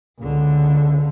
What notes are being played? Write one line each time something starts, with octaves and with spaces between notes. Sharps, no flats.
C#2 D3